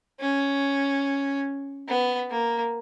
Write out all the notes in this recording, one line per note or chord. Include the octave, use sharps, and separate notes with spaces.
C#4
B3
A#3